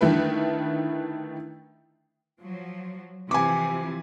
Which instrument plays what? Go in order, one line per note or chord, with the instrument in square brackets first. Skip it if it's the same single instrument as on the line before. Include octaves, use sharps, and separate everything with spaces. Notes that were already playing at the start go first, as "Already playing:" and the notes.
[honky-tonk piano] D3 D#3 A3 E4 B4
[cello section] F3 F#3
[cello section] C3 E3 F3 [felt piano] G#5 D6